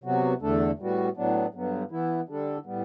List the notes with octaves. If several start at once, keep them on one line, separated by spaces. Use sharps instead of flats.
C3 F#3 B3 F#4
E2 D3 A3 D4 A4
A2 G3 B3 F#4
A2 F#3 B3 D4
G2 D3 F#3 B3
E3 B3 E4
D3 G3 D4 A4
A2 G3 B3